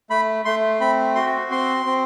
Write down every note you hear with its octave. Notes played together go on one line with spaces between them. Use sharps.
A3 B5
A3 C6
C4 B5
F#4 C6
C4 C6
C4